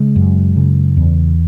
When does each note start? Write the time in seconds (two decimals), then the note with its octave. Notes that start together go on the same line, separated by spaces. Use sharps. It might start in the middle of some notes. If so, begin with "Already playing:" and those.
Already playing: C#3 G#3
0.16 F#2
0.56 C#3
0.97 E2